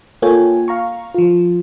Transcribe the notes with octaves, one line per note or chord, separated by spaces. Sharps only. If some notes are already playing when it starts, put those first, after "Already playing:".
A#3 F4 A4 C#5 G5 G#5
F5 A#5 C#6
F3 F4